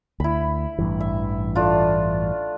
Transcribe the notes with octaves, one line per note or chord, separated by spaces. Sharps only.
D2 E4 B5
A1 G2 E3
E5
A3 D4 F4